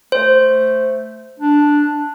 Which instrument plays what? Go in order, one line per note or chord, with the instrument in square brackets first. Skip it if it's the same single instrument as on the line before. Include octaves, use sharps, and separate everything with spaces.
[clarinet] A3 [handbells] C5
[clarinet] D4